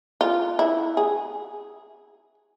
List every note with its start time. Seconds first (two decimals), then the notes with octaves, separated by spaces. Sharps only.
0.21 F4
0.59 E4
0.97 G#4